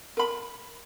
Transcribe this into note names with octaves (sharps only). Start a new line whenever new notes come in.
A#4 B5